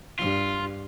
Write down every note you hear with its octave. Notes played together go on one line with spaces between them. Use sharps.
G2 F4